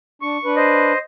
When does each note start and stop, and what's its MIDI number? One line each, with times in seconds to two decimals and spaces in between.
0.22 0.37 62
0.22 0.55 85
0.45 0.93 62
0.45 0.93 71
0.56 0.98 72
0.56 0.98 75